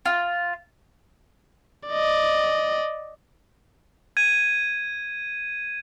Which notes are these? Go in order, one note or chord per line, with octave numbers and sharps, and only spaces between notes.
F4
D5 D#5
G#6 D#7